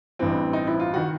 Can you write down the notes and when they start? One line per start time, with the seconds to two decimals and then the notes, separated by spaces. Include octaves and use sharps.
0.19 A1 G2 E3 C4
0.53 D#4
0.67 E4
0.80 F4
0.94 D#3 F#4